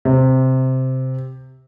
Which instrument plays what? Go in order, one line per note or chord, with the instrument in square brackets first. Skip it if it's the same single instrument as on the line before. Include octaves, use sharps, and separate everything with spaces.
[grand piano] C3